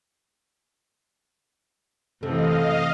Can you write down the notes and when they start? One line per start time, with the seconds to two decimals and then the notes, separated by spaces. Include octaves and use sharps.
2.23 F#2 C3 E3 A3 D#5 F5